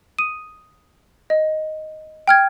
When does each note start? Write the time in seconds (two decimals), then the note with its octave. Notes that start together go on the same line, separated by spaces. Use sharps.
0.19 D#6 D#7
1.30 D#5
2.28 G5 F6 G#6